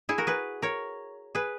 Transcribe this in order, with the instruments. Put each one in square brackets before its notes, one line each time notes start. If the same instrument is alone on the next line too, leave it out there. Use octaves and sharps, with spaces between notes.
[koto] E4 G#4
F#4 A#4
G#4 B4
A#4 C#5
G#4 B4